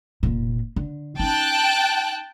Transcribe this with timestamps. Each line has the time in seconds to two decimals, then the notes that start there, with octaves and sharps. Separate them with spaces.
0.23 F1 A#2
0.76 D3
1.20 C#4 D#4 G5 A5 F#6